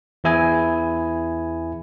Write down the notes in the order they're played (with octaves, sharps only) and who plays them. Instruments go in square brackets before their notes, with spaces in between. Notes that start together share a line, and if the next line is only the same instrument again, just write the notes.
[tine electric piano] E2 E3 E4 G#4 G#5